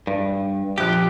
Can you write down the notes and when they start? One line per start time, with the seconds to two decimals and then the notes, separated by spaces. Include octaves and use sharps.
0.07 G2
0.78 A#1 F3 G4 F#6